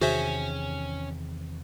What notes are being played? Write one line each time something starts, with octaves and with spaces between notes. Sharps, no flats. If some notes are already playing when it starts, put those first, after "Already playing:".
E2 C3 D#3 C#4 F#4 G#4 C5 E5